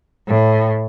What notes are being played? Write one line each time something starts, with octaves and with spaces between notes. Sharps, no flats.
A2